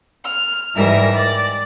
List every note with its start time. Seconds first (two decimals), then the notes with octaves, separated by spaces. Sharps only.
0.24 F6
0.75 G#2 E3 G3 A#4 E5 A#6
1.13 D5